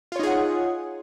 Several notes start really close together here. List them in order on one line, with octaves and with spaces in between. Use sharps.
F4 C#5 D#4 G#4 F#5